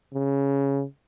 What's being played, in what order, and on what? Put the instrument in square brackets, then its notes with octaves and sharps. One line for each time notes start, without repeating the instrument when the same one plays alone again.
[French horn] C#3